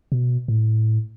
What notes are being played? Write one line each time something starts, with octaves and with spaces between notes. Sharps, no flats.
B2
A2